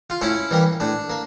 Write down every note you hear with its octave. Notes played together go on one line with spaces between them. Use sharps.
F4
A2 C#4 E4
E3 G3 A#3
A2 D4
A#3